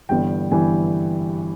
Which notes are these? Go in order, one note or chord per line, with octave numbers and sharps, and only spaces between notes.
G1 G2 E3 G5
G1 G2 E3 G#5